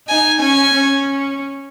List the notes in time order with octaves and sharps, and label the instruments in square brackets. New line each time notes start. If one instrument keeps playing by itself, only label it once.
[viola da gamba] D#4 [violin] G#5
[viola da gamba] C#4 [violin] G#5
[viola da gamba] C#4